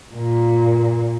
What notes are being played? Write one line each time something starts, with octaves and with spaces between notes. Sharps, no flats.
A#2